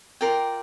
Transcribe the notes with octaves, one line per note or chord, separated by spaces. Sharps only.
F4 A#4 D5 G5